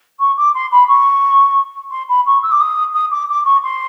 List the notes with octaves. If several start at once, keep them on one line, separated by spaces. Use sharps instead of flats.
C#6
D6
C6
B5
C#6
C6
B5
C#6
E6
D6
D#6
D#6
D6
D6
C#6
C6